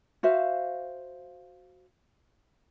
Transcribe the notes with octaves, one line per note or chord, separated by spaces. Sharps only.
F#4 C5 E5 F5